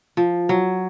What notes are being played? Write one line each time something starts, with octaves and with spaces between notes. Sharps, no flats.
F3
F#3